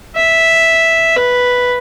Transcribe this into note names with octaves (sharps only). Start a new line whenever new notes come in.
E5
B4